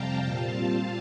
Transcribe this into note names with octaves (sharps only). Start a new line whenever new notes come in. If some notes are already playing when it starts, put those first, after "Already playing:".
Already playing: F2 C3 G3 F5 G5 A5 A#5
A#2 G3 C4 F4 F5 A5